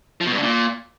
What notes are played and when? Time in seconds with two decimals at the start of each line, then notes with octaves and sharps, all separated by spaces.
0.21 F3
0.26 B2
0.32 G2
0.37 D3
0.42 A#2